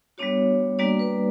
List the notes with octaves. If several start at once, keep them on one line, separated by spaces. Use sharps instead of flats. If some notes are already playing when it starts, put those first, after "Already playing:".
G3 B3 D4 F#4 C#5
G3 A#3 D4 F#4 D5
B4